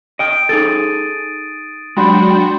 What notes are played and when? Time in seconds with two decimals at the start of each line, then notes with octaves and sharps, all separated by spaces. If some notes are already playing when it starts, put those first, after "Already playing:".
0.19 D#5 G5 D#6 D7
0.49 D#4 G#4 A4 A6 D#7
1.97 F#3 G#3 D4 F#4 G5 B5 C6